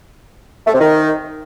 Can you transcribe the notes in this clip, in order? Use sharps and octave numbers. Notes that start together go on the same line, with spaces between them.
A3
C3
D#3